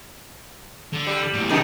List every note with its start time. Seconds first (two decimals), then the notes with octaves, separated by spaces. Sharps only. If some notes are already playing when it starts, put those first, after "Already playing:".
0.93 D3
1.07 G3
1.33 B1 A2
1.49 C2 F#2 D#3 G#4